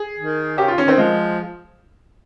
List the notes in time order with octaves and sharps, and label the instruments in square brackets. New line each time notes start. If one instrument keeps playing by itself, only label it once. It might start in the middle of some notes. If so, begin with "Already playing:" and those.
Already playing: [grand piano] G#4
[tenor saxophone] D#3
[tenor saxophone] C#3 [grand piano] G4
[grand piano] F4
C#4
[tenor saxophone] D#3 [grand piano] C4
[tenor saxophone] F3 [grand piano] G#3